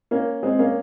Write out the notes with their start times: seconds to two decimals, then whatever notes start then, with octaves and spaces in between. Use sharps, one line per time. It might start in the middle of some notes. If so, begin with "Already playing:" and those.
0.11 A#3 C#4
0.43 G#3 C4
0.59 A#3 C#4